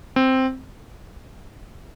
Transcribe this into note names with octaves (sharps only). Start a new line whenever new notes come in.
C4